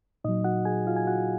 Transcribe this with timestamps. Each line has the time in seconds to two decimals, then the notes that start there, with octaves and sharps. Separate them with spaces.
0.24 A#2 F#3 D#4 D#5
0.44 F#4 F#5
0.65 G#4 G#5
0.87 F4 F5
0.96 G#5
1.07 F#4 F#5